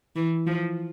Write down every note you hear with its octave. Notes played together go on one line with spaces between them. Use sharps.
E3
F3